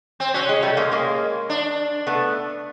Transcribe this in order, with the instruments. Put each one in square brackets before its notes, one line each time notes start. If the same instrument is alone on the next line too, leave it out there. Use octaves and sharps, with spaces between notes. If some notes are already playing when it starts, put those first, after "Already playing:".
[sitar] C4
[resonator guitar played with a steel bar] F#3 [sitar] C#4
[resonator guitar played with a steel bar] G#3
G3 A3
G#3 A#3
G#3 A#3
[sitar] D4
[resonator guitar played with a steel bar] A3 B3